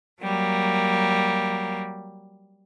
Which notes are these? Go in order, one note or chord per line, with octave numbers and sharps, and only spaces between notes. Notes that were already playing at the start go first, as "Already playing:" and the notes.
F#3 G3 A#3